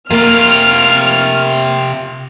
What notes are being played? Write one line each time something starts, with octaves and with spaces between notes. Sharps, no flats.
C3 A#3 F4 F6